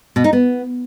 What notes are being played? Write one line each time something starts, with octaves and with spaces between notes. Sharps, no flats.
B2
D#4
B3